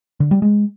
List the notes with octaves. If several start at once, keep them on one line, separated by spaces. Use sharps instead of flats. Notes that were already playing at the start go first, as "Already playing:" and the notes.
D3
G3
G#3